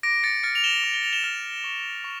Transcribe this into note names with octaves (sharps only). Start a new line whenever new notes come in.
D6 A#6 D7
A6 C#7
F6 A6 C#7
F7
E7 G7
D6
G7
F7
E7 G7
F6
C#6
C#6